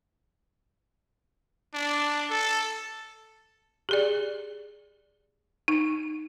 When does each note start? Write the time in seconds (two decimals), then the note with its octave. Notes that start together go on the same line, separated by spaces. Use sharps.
1.74 D4
2.30 A4
3.89 G4 G#4 D5
5.68 D#4